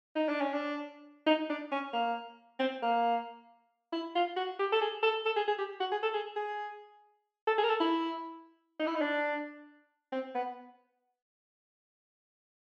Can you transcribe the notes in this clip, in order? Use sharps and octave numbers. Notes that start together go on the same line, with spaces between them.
D#4
D4
C#4
D4
D#4
D4
C#4
A#3
C4
A#3
E4
F4
F#4
G4
A4
G#4
A4
A4
G#4
G#4
G4
F#4
G#4
A4
G#4
G#4
A4
G#4
A#4
A4
E4
D#4
E4
D#4
D4
C4
B3